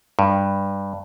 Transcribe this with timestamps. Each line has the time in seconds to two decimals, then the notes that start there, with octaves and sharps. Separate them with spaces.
0.19 G2